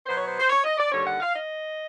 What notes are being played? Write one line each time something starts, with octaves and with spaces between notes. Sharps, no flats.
B2 F#3 B3 C5
C#5
C5
C5
C#5
D#5
D5
D#2 D3 G3 C#5
F#5
F5
D#5